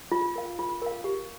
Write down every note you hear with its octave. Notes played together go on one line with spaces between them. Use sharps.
F4
A#4 F5
F4
A#4 F5
G4